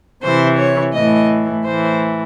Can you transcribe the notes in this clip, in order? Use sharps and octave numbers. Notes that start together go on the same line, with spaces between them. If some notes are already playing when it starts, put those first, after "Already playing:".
C3 E3 C5
C#5
A2 E3 D#5
A2 E3 C5